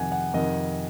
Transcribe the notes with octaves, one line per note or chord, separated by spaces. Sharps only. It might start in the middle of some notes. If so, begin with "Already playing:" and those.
Already playing: F2 C3 D#3 F#5 G#5
F#5
F2 C3 D#3 D#5